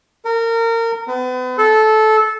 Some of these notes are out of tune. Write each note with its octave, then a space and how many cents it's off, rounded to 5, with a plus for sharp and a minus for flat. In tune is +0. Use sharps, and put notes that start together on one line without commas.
A#4 -25
B3 +40
A4 -15